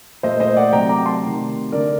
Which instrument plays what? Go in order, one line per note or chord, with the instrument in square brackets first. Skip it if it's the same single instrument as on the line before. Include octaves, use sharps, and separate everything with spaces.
[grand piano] A#2 A3 C5 D#5
C5 D#5
D5 F#5
C3 F#3 A3 G5 A#5
A#5 D6
A5 C6
C3 D#3 A3
D3 A3 A#4 D5